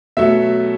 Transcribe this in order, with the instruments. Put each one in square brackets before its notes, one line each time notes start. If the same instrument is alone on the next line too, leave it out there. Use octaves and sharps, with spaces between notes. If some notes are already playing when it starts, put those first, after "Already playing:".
[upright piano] B2 F#3 A3 E5